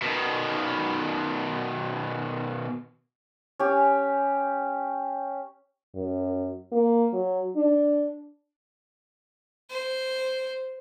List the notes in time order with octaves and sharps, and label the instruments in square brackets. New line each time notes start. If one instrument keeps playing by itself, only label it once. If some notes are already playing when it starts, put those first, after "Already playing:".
[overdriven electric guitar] B2 D#3
[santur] C#4 G4
[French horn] F#2
A#3
F#3
D4
[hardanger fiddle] C5